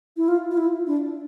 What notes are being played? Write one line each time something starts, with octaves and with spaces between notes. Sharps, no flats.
E4
F4
F4
E4
D4